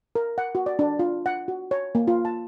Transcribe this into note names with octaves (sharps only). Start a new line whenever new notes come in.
A#4
F#5
F#4
D5
D4
F4
F#5
F#4
C#5
A#3
F4
A5